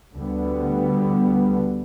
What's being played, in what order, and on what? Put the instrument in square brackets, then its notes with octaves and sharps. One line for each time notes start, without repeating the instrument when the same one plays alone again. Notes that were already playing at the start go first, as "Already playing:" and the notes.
[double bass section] D2 D3 G3 B3